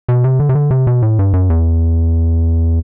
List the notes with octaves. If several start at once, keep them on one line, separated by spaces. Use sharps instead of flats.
B2
C3
D3
C3
D3
C3
B2
A2
G2
F#2
E2